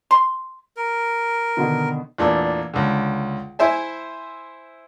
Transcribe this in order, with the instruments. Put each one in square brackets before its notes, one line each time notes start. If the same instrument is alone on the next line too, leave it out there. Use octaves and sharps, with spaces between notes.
[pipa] C6
[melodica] A#4
[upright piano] B2 D3 D#3
[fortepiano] E2 A#2 A3 D4
C#2 D3
E4 C5 E5 G#5